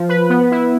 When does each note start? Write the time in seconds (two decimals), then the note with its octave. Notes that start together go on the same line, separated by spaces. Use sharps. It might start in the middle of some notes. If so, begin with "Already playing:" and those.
Already playing: F3
0.09 B4
0.29 B3
0.51 E4